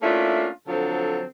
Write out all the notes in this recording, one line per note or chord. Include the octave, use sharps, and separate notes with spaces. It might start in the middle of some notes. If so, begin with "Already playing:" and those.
A3 A#3 C#4 D4 E4 F4
D3 F3 F#3 C4 A4